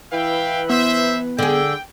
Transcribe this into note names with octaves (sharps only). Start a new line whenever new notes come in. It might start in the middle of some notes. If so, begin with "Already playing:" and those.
E3 E4 B4 E5 F5 G5
B3 C5 E5
D3 G#4 G5